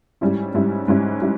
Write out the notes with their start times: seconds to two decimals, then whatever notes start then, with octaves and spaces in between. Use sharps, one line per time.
0.21 G#2 G3 C#4 E4
0.54 G#2 G3 C#4 E4
0.88 G#2 G3 C#4 E4
1.22 G3 C#4 E4